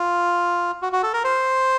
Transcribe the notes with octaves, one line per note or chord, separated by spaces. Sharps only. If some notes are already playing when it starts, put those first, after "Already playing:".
Already playing: F4
F#4
F#4
A4
A#4
C5